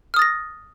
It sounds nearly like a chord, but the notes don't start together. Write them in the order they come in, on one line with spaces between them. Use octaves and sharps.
F6 D#6 A6 A#6